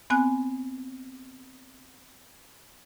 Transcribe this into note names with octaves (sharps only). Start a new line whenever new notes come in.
B3 C4 G#5 F#6